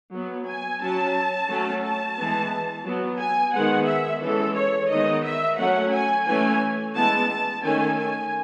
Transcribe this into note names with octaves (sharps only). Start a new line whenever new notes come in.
F#3 B3
G#5
F#3 C#4 A5
F#3 A3 C#4
A5
E3 G#3 B3
F#3 B3
G#5
D#3 G#3 B3 F#5
E5
E3 G#3 C#4 A4
C#5
D#3 G#3 B3 D#5
E5
F#3 A3 C#4 F#5
G#5
E3 A3 C#4 G#5
E3 G#3 B3 A5
A5
D#3 A3 C#4 G#5
G#5